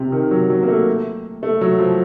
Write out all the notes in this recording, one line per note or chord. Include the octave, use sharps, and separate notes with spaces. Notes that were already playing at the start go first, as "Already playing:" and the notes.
Already playing: C3
D#3
F#3
F#3
A#3
A3
A3
F#3
F3